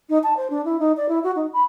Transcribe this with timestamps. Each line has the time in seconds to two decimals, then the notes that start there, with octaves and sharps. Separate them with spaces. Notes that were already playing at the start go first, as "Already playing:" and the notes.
0.09 D#4
0.24 A5
0.37 C5
0.50 D4
0.65 E4
0.79 D#4
0.97 D5
1.09 E4
1.24 F#4
1.36 D#4
1.53 B5